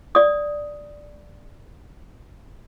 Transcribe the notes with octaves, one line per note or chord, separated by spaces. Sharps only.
D5 D#6